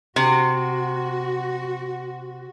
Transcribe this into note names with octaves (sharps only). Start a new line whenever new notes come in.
C3 F#4